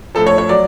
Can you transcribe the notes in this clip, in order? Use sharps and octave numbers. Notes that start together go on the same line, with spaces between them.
A2 F3 A4
C#5
C#5
F#3 D5